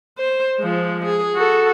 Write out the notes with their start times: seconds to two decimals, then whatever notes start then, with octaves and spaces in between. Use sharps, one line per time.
0.18 C5
0.59 F3 G#3
1.05 G#4
1.36 F#4 A4